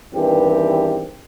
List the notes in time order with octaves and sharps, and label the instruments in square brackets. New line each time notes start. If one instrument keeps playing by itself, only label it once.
[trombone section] E2 G2 D#3 E3 C4 G4